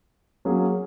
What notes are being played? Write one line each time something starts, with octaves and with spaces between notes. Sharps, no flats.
F#3 A#3 C#4 G#4